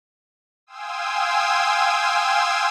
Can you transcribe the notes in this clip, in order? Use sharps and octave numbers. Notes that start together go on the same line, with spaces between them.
F5 G5 G#5 C6 D#6 E6